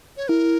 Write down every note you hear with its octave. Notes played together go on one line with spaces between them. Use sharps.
C#5
E4 A#4